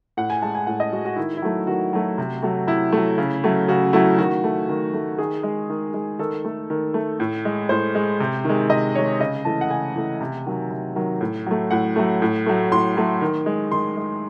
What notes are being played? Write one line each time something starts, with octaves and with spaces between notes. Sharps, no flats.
A2 F#5
G#5
G#3 A5
G#5
A2 F#5
D#5
G#3 F#4
F#4
D#3 E4
E4
F#3 A3
D#3 F#4
F#3 A3
C3
F#3 A3
C3 E4
F#3 A3
C#3
F#3 A3
C#3 F#4
F#3 A3 E4
D#3 F#4
A3
D#3
A3
D#3 G#4
G#3
D#3
G#3
D#3 A4
A3
D#3
A3
A2
G#3
A2 C5
G#3
C3
D#3 G#3
C3 D#5
D#3 G#3 C#5
C#3 D#5
E3 A3 A5
F#5
C#3 G#5
E3 A3
C3
D#3 F#3
C3
D#3 F#3
A2
F#3 A3
A2 F#5
F#3 A3
A2
F#3 A3
A2 C6
F#3 A3
D#3
G#3
D#3 C6
G#3